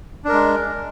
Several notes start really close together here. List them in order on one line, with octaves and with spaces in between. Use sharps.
D4 A#4 G#3